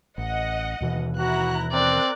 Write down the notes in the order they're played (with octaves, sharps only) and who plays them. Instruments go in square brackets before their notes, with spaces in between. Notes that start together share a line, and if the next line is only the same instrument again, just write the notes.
[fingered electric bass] A1 [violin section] D#5 F#5
[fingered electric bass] D#2 B2 E3
[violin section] E4 A#5 F#6 [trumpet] F#4
[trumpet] C4 [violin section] A#4 F#6 [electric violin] D5